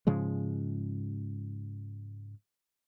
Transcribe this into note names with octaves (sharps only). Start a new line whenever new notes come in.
G#2 C#3 F3 G#3